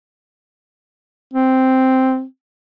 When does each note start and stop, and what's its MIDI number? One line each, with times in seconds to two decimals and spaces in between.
1.34 2.24 60